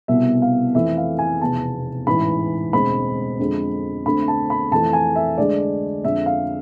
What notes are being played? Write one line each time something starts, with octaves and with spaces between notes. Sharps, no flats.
C2 B2 B3 E5
F5
F2 E3 A3 E5
F5
G#5
F1 E2 B2 A5
A1 G#2 E3 B5
E1 D2 D3 G#3 C4 B5
F2 D3 G#3
D2 D3 A3 C4 B5
A5
B5
F2 E3 A3 A5
G#5
E5
D2 D3 G#3 D5
F2 D3 G#3 E5
F5